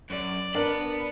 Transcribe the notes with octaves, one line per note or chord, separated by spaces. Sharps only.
F#2 D5
B3 D4 A#4 B5